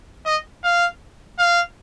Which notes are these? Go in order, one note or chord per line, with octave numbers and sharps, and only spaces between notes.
D#5
F5
F5